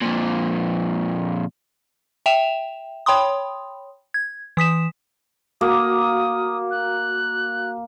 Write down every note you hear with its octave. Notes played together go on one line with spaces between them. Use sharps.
F2 A#2
E5 G5 E7 F7
C#5 G5 B5 C6 D#6
G#6
E3 D#6 B6 E7
A#3 F#4 D#6
F#6